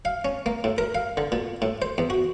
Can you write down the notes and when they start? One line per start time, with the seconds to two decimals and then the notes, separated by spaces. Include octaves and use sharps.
0.05 F5
0.25 C#4
0.46 A#3
0.64 A2
0.78 A#4
0.95 F5
1.17 D3
1.32 A#2
1.62 A2
1.82 C5
1.98 E2
2.10 F#4